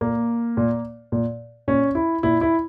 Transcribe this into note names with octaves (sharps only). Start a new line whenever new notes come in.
A#2 A#3
A#2
A#2
A#2 C#4
E4
A#2 E4
E4